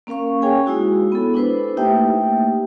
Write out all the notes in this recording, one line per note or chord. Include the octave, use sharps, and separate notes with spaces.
A#3 C#4 A#4 F5 C#6
C#4 G#4 C#5 G5 G#5
G#3 D#4 E4 F#4
B3 A4
D4 E4 B4 C5
A3 A#3 D#4 G4 E5 G5